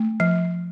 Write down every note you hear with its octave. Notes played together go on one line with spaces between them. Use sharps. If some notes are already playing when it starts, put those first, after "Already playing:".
Already playing: A3
F3